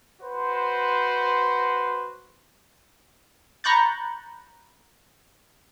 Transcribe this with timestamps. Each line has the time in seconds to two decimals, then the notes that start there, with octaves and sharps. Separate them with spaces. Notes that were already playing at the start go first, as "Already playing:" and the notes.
0.23 F#4 B4 C5
3.64 A#5 B5 C#6 F#6 G6 A6